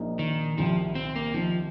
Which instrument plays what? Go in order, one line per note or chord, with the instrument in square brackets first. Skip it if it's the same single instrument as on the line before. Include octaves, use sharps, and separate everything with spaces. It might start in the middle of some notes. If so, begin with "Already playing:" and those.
Already playing: [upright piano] A#1 A#2 A#3 D#4
[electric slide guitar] D#3
[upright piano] C2 C3 D#3 [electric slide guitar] F3
[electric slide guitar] C4
A#3
[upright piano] D#3 C4 D#4 [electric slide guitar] F3